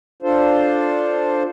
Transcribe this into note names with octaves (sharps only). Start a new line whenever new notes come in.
D4 F4 A4 C5